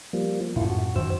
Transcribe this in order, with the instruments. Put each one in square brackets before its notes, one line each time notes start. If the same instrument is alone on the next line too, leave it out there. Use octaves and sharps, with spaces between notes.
[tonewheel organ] F3 G3 A#3
[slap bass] F#2 A2 [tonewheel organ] E4 F4
[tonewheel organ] F#4
[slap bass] F#2 D#3 [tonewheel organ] C5 E6